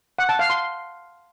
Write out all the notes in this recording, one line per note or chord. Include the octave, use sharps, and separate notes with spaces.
F#5
A5
F5
C6